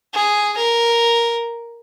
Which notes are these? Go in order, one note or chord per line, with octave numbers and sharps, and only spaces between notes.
G#4
A#4